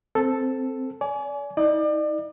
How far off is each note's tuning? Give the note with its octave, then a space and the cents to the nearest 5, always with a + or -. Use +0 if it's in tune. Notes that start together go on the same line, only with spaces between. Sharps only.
C4 +0 A4 +0
D5 -35 G#5 +20
D#4 +40 D5 +35